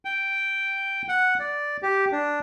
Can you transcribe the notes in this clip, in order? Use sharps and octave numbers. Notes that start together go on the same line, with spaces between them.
G5
F#5
D5
G4
D4